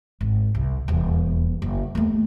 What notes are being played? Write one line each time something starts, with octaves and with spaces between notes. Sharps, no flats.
G#1
C2
D#1 E2
F#1
D#2 A3